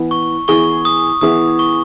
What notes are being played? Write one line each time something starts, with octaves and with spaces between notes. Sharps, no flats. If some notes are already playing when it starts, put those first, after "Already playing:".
Already playing: E3 B3 E4
C#6
E3 B3 E4 G#4 C#6
D#6
E3 B3 E4 G#4 D#6
C#6